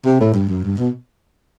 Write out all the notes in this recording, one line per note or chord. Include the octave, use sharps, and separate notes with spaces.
C3
A2
G2
F#2
G2
B2